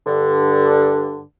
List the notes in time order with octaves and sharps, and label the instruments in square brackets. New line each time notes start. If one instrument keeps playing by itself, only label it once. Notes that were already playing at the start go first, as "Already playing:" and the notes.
[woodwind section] G2 D3